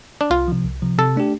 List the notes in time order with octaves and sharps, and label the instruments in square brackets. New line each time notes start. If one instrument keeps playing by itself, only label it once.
[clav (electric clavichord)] D4
[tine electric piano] C2 [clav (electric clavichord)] F4
[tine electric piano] C3 F3
C2
C3 F3
[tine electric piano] C3 [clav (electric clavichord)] A4
[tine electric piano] A3 D4 G4